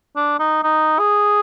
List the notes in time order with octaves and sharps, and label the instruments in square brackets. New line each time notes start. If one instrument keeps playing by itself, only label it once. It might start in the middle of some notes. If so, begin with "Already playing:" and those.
[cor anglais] D4
D#4
D#4
G#4